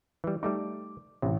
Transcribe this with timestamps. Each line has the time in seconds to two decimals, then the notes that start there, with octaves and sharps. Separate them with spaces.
0.24 E3 G3
0.43 G3 A3 D#4 D6
1.22 A1 C3